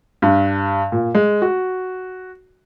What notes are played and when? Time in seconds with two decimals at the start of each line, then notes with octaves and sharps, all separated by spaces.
0.22 G2
0.92 A#2
1.15 G#3
1.42 F#4